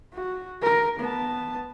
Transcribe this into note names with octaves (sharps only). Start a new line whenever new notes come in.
F#4
A#4
B3 A5